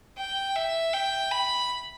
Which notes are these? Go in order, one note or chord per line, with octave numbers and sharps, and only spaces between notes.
G5
E5
G5
B5